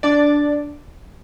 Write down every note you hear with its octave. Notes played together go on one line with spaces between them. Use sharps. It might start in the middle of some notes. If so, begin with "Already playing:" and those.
D4 D5